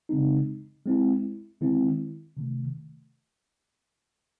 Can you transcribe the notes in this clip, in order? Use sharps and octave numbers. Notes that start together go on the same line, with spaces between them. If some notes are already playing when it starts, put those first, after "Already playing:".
C#3 G#3 C4 D#4
G#3 C4 E4
D#3 G#3 C4 E4
C3 D#3 A3